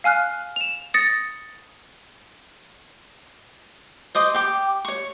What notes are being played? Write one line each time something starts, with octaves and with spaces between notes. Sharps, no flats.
F5 G#5 F6 F#6
E7 F7
D#6 A6 A#6 C#7
C5 D#5 D6 D#6
G4 G5 D6
C#5 C#6